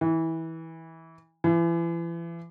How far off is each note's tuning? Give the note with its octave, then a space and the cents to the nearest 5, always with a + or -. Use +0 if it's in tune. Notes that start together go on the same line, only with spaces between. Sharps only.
E3 -20
E3 +35